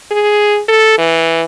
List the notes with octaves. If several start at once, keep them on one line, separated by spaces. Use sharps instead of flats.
G#4
A4
E3